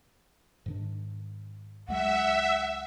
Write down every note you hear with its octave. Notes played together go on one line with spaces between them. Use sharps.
G#2 D#3 D4
C#2 F#3 G#3 E5 F#5